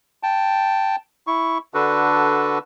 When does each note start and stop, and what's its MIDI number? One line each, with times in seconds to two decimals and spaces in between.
0.23 0.96 79
0.23 0.96 81
1.27 1.58 64
1.27 1.58 85
1.74 2.59 50
1.74 2.59 62
1.74 2.59 66
1.74 2.59 69
1.74 2.59 71